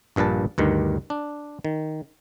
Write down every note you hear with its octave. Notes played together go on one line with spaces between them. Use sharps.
A#1 G2 A#2 B4 A5
D2 G2 D#3
D4
D#3